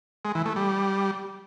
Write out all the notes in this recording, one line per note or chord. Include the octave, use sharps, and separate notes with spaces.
G#3
E3
A3
G3